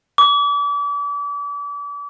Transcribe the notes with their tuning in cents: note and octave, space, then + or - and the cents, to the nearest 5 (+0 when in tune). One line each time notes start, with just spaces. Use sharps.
D6 -35